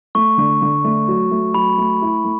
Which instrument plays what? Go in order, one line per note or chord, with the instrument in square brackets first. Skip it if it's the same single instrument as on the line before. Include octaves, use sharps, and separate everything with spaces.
[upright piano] A3 [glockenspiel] C#6
[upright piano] D3
D3
A3
F#3
A3
[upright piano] F#3 [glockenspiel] B5
[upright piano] A3
E4
A3